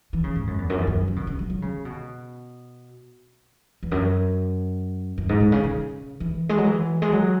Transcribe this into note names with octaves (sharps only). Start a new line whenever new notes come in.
E3
C#3
G#2
F#2
E2
F#2
E2
F#2
C#3
B2
C#3
F#3
F#3
C#3
B2
E2
F#2
F#2
G#2
B2
C#3
C#3
E3
G#3
F#3
E3
G#3
F#3